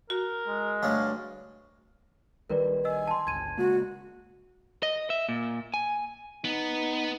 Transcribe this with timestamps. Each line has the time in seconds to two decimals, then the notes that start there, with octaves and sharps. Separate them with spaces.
0.10 F#4 A#4
0.48 G#3
0.83 D2 G2 C#4 F5
2.50 A#1 D#3 G3 A#4 B4 D5
2.85 D#5 G#5 E6
3.08 A5 C6
3.27 G1 C#2 G#6 D#7
3.57 C#3 G#3 A#3 F#4
4.83 D#5
5.10 E5
5.29 A#2
5.74 G#5
6.45 B3 D#4